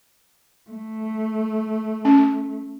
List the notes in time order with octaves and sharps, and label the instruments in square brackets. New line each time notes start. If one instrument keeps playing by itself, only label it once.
[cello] A3
[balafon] C#4